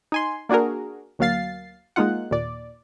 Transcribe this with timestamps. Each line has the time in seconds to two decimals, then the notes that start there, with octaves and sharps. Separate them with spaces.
0.12 D#4 G#5 C6
0.49 A#3 D4 F#4 G#4 A#4
1.19 D2 F#3 A#3 F5 A6 C7
1.96 G#3 A#3 D#4 F4 F#5
2.31 D#2 A#2 D5